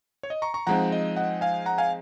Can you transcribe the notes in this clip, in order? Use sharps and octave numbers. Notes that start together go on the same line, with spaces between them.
C#5
D#5
A#5 C#6
A#5 C#6
F3 G#3 C4 D#4 F#5 A#5
D#5
D#5 F#5
F5 G#5
F#5 A#5
F5 G#5